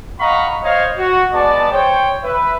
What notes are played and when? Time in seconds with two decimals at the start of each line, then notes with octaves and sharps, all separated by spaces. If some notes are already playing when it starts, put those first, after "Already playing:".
0.20 D#5 F5 F#5 A#5 B5 C#6
0.63 C5 C#5 D#5 F5
0.97 F#4
1.34 G#3 B3 D5 A5
1.72 C5 C#5 G5
2.24 B4 E5